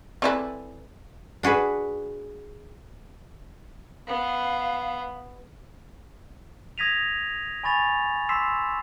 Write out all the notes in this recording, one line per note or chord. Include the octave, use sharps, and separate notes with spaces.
C4 E4 A4 B4 D5 G#5
D4 F#4 G#4 B4
B3 F5
D#6 G#6 A#6 B6 D#7 F7
G#5 B5 C#6 A6 F7
C6 D6 E6 B6 C7 E7